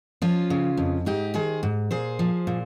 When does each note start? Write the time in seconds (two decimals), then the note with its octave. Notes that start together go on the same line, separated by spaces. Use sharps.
0.22 F3 C#4 F4
0.50 C#3
0.77 F2
1.06 G#2 D#4 G4
1.34 D#3 G#4 C5
1.63 G#2
1.91 A#2 G#4 C5
2.19 F3
2.47 A#2